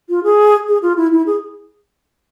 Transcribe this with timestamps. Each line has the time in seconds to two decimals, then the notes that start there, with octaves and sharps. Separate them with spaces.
0.09 F4
0.24 G#4
0.68 G#4
0.82 F4
0.97 E4
1.12 E4
1.26 G#4